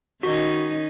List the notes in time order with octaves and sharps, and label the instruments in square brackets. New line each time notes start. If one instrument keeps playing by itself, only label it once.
[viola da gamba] D#3 C#4 D#4 [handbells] F#4